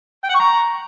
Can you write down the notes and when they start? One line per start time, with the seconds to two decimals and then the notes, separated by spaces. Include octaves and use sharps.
0.24 G5
0.29 F#5
0.35 C#6
0.40 A#5